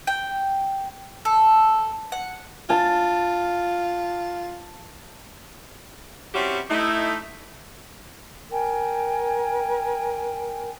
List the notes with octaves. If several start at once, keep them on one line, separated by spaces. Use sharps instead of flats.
G5
A4
F#5
F4 A5
G3 C4 C#4 E4 F#4 G4
A3 D#4 E4
A#4 G5 G#5